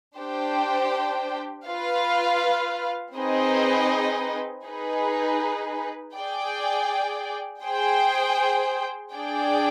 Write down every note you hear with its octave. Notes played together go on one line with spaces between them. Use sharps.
D4 G4 C5 G5
F4 B4 F5
C4 D#4 G#4 B4 D#5
D#4 G#4 B4
G#4 D5 G5
G#4 C5 G5
D4 G#4 D5 G5